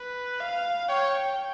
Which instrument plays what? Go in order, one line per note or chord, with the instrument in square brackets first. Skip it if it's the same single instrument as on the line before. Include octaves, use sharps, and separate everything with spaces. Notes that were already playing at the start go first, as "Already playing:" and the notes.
Already playing: [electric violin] B4
F5
[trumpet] C#5 [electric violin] G5